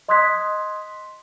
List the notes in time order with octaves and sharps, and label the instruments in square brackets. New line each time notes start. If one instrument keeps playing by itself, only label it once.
[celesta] D#5 C6 D#6 F#6 G#6 B6